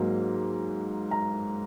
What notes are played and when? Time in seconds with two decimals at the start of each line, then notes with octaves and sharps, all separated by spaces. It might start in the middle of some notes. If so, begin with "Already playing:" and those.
Already playing: G#2 F#3 A#3
1.11 A#5